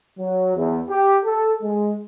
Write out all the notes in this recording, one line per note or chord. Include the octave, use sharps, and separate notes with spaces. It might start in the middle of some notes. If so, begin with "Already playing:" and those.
F#3
E2
G4
A4
G#3